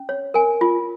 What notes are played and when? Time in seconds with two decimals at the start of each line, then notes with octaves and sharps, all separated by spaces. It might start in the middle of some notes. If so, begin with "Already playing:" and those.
Already playing: C#4
0.09 C#5
0.34 A#4 G#5
0.61 F4